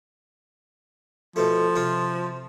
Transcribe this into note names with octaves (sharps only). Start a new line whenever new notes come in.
B2 F3 A3
C3 F4